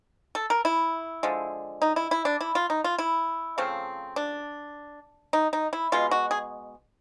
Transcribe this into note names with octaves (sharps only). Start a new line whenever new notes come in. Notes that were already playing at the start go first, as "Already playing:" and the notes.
A4
A#4
E4
D3 F3 G#3
D#4
E4
E4
D4
E4
F4
D#4
F4
E4
C#3 F3 A3 C4
D4
D#4
D#4
E4
B2 G#3 B3 F4
F#4
G#4